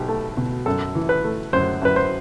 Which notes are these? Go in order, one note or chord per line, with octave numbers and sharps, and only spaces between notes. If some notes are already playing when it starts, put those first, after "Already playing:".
Already playing: B1 G4
A3
B2
F#2 A4
E3
B4
A3
F#2 C5
F#2 B4
C5